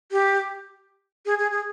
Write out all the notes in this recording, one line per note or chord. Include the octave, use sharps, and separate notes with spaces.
G4
G#4
G#4
G#4